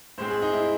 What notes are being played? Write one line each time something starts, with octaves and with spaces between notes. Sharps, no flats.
A2 G#3 C4 C5
G#4
D#4
E4